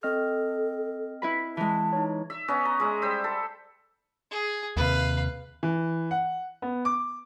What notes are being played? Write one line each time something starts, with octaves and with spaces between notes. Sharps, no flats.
C4 A4 D#5 F6
E4 B4 B5
E3 G#3 A5
D#4 C#5
E5
B3 C#4 D#5
A#5
G#3 E5
G3 C5 E5
A4
G#4
D#2 C3 B4 F5
E3
F#5
B3
D6